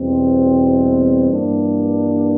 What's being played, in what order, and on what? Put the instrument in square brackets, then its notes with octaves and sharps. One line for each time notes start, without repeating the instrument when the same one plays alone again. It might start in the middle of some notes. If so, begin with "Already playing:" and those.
Already playing: [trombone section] E2 B2 G3 C4
G2 E3 G3 A#3 D4